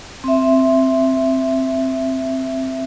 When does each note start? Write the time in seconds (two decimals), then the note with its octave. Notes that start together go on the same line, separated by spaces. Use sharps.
0.24 C4 E5